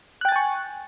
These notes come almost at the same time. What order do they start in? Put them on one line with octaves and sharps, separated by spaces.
F#6 G5 A6 G#5 C#6